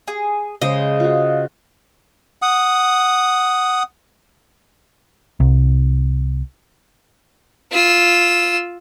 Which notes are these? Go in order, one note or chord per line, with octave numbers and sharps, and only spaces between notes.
G#4
C#3 G#3 C5 D#5
F4 F#4
F#5 D#6
C2
F4 E6